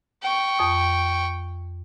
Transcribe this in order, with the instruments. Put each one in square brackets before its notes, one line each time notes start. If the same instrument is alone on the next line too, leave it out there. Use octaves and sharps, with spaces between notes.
[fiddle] G5 C#6
[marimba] F2 D#6